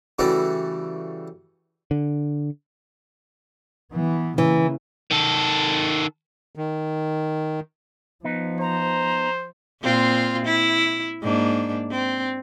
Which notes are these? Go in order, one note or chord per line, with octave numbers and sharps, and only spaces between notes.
C#3 E3 G3 A3 E4 F#4
D3
E3 B3
C#3 E3 A#3
D#3 A4
D#3
F3 B3 D#4
C5 A#5
A#2 C4 F4
E4
G#2 A#3 D4
C4